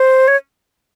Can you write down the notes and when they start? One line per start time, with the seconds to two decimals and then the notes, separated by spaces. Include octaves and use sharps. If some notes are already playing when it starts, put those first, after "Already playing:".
Already playing: C5
0.28 C#5